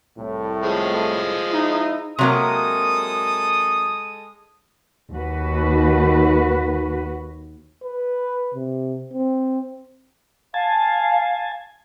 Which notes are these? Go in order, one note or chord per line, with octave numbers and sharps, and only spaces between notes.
C2 A2
F3 G#3 D#5
D#4 E4
C3 F#3 G#3 A#3 A4 D#6
D#2 F#4 B4
B4
C3
C4
F5 G#5 A5